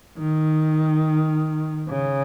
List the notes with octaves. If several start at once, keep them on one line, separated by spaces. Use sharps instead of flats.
D#3
C#3